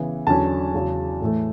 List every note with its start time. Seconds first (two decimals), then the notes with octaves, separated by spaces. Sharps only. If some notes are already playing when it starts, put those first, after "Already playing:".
Already playing: C#3 E3 B3
0.27 E2 D3 F#3 C#4 A5
0.74 E2 C#3 F#3
1.21 A2 E3 A3